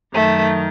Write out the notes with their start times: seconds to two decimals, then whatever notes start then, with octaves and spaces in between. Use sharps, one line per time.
0.14 F#2 D#3 A3